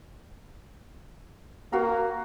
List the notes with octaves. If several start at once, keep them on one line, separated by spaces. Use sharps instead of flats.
A#3 F#4 F5 A#5